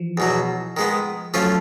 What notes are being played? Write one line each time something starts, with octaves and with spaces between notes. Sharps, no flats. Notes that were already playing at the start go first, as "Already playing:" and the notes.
Already playing: E3 F3
E2 B2 F#3
D#3 G#3 B3
F3 F#3 A3 C#4 F4